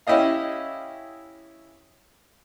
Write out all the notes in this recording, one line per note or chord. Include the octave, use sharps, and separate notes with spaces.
C#4 E4 G4 D#5 F5